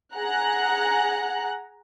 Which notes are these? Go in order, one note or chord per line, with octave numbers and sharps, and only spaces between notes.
G#4 F#5 A#5 F#6